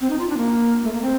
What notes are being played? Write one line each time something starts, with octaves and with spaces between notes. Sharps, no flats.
C4
D#4
F4
D4
A#3
A3
A#3
C4